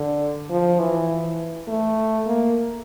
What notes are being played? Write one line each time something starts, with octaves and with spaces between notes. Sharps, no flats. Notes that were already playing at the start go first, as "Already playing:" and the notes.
Already playing: D3
F3
E3
A3
A#3